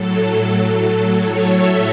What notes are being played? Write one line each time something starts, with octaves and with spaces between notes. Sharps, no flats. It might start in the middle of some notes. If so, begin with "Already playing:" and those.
Already playing: A2 F#3 A4
C#5
E5